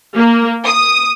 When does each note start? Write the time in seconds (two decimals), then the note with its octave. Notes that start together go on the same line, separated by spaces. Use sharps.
0.15 A#3
0.65 D#6